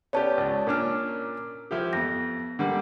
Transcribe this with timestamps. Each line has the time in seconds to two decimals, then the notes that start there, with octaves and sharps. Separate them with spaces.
0.13 B3 C#4 G4 C#5 D5 A5
0.37 C#2
0.67 A#2 C#4 D4 A#4 F6
1.71 F3 E4 G4
1.93 F2 B3 A#6
2.59 D3 G3 A#3